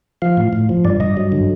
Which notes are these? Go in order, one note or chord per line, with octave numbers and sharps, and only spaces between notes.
F3 F5
A2
A2
F3
G2 D5
G2 D#5
F#3
D3